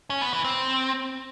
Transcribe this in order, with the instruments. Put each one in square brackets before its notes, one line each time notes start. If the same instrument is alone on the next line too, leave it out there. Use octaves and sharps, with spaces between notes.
[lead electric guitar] C#4
B3
E3
C4